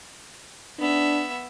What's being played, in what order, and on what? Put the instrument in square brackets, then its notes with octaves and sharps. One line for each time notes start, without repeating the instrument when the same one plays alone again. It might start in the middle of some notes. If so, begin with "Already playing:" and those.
[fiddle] B3 E5 [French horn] D4